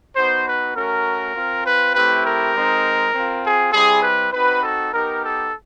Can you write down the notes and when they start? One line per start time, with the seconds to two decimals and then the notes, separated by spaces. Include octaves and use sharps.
0.15 B3 D#4 F#4 C5
0.45 B4
0.75 A3 C#4 F#4 A#4
1.34 C4 F4
1.64 B4
1.94 A3 C4 E4 G4 B4
2.24 A#4
2.54 G#3 C4 D#4
3.14 C4 F4
3.43 G#4
3.72 G3 C4 E4 G#4
4.02 B4
4.32 C4 D#4 F#4 B4
4.62 A4
4.91 B3 D#4 G4 A#4
5.22 A4